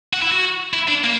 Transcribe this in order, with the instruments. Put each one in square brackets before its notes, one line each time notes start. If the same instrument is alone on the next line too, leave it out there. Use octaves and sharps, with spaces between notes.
[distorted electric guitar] F#4
E4
F#4
E4
D4
A#3